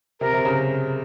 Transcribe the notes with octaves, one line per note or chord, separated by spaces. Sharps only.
C3 A#4
C3
C#3